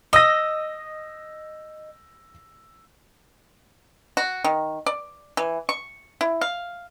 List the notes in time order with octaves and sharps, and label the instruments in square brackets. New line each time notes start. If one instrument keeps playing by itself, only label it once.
[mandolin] D#5 [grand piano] E6 A#6
[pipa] F#4
D#3
D5
E3
C#6
E4
F5